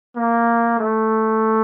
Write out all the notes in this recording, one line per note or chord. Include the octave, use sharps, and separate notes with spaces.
A#3
A3